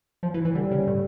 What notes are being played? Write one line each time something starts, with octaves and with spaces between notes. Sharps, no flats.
F3
E3
E3
D3 G3
C#3
A2